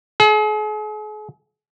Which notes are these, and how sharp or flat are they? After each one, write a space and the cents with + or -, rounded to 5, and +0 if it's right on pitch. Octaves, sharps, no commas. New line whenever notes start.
G#4 +40